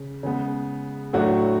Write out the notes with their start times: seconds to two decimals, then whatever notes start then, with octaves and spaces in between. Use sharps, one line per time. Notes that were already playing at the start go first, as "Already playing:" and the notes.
Already playing: C#3
0.23 C#3 G#3 B3
1.13 A2 F#3 A3 D4 F#4